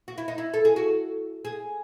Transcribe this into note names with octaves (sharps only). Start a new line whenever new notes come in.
F#4
E4
D#4
E4
A4
G#4
F#4
G#4